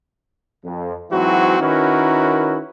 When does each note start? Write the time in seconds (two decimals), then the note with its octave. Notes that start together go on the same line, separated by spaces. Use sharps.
0.64 F2
1.11 G#2 E3 F#3 C4 E4 F#4
1.60 D#3 C#4 E4 F#4 A#4 B4